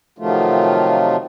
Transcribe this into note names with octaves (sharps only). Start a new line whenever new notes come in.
C3 D#3 F3 F#3 A3 F4